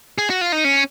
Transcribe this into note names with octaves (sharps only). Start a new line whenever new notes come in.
G#4
F#4
F4
D#4
C#4